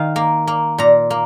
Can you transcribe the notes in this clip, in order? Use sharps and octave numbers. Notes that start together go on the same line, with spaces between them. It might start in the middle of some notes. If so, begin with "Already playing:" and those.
Already playing: D#3 F5
A#3
A#3
A#2 A#5
A#3